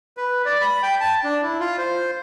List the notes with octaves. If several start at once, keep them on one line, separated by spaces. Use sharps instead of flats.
B4
D5
B5
G5
A5
D4
E4
F4
C5